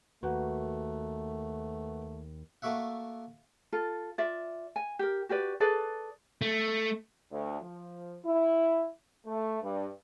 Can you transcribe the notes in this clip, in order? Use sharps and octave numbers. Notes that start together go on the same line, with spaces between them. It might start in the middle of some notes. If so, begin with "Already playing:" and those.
D#2 A3 F#4 B4 F#5
A3 A#3 F#4 E5 F#5
F4 A4
F4 D5 E5
G#5
G4 A#4
F#4 G4 B4 D5
G#4 A4 B4 D5
A3
D2
F3
E4
A3
G2